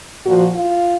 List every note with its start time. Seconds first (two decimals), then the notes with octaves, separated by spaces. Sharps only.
0.22 A#2 F3 F#4
0.53 F4